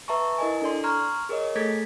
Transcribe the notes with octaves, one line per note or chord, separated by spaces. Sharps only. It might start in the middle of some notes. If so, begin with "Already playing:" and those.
B4 E5 A5 A#5 C#6
E4 A#4 D#5 G#5
D4 A4 D5 C6
A#5 C6 C#6 F6 G#6
G#4 A#4 C#5 D#5
A3 G#4 A4 G#6 A6 B6